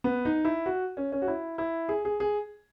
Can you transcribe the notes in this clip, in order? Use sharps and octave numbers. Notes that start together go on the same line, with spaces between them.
B3
D#4
E4
F#4
C#4
C#4
F#4
E4
E4
G#4
G#4
G#4